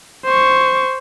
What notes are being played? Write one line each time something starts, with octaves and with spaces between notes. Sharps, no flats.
C5 C#6